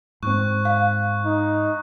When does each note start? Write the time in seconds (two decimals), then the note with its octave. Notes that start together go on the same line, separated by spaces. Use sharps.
0.23 G#2 C4 C#6 F#6
0.65 F5 F#6
1.25 D#4